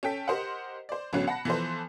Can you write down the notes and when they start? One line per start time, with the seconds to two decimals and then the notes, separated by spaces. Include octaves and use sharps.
0.03 C#4 A4 G5 B6
0.28 G4 A#4 C5 D#5 F#5
0.89 C5 D5
1.13 A1 D3 F#3 B3 C#4 F#6
1.27 F#5 A5 B5 A#6
1.45 E3 F3 B3 A4 B4 C5